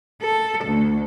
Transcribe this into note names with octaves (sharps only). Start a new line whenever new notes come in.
A4
D2